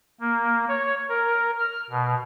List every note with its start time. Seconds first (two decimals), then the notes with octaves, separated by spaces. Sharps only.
0.21 A#3
0.69 C#5
1.09 A#4
1.59 F6
1.90 B2